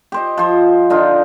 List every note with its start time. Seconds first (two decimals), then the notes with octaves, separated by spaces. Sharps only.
0.12 G4 C5 D#5
0.38 F3 C5
0.90 D3 D#4 F4